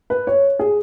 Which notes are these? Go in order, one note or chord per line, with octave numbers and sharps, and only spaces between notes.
B4
C#5
G#4